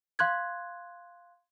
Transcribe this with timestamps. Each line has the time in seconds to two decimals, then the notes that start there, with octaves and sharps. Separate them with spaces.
0.19 F5 C6 F#6 G#6